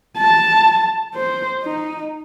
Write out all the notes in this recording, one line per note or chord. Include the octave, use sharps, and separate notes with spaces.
A5
C5
D#4